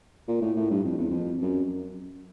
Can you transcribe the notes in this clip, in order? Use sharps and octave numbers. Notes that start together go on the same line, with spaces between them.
A#2
A2
A2
G2
F2
E2
F2
F#2